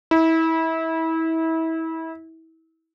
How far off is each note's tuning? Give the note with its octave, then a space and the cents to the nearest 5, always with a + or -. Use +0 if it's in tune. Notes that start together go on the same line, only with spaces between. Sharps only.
E4 -30